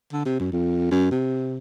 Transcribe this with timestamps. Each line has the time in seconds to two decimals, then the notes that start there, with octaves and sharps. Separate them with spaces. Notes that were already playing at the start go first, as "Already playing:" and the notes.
0.12 D3
0.25 C3
0.40 F#2
0.52 F2
0.91 F#2
1.11 C3